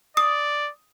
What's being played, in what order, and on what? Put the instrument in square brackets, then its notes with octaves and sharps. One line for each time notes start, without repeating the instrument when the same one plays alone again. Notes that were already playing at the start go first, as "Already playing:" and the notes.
[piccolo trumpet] D5 [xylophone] D#6